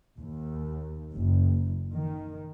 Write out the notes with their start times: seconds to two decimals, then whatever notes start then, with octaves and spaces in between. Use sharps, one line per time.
0.17 D#2
1.15 F#1
1.93 D#3